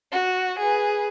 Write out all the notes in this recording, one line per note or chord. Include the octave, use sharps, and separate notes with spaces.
F#4
G#4 B4